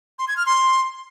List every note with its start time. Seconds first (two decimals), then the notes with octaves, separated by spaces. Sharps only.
0.19 C6
0.28 G#6
0.37 F6
0.46 C6